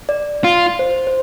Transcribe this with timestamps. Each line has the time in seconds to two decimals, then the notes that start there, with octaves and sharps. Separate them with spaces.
0.09 D5
0.44 F4
0.79 C5
1.07 C5